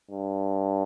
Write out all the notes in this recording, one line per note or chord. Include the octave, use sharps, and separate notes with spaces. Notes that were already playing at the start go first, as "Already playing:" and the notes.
G2